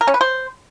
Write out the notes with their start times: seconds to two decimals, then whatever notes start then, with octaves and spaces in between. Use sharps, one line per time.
0.01 A#4
0.07 C#4
0.14 B4
0.21 C5